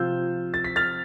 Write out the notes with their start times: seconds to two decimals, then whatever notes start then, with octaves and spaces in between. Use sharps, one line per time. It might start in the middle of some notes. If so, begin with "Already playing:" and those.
Already playing: C3 F3 C4 F4 E6 G6
0.54 A6
0.64 B6
0.76 F6 A6